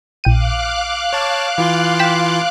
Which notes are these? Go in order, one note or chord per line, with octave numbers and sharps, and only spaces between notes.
A#1 F5 G5 D6 F#6 D#7
C#5 A5
E3 F4 C6
G5 B6 E7